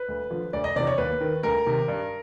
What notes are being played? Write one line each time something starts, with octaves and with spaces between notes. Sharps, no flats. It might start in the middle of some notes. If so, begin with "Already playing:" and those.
Already playing: B4
D2
D3 F3
D2 D5
D#5
C3 E3 D5
C#5
D#2 B4
D#3
D2 A#4
C3 D#3
G2